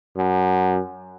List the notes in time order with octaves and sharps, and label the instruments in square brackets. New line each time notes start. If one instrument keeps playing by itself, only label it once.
[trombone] F#2